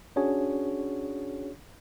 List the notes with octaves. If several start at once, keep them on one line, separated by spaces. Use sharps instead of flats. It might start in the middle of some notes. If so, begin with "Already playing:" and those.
C#4 D4 F#4 G#4 C#5